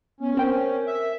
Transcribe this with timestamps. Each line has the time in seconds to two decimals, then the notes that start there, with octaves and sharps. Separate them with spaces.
0.21 B3 C#4
0.37 C4 A#4 G5
0.87 E5